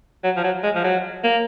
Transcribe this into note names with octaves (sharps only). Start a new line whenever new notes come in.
F#3
F3
F#3
G#3
F3
F#3
A#3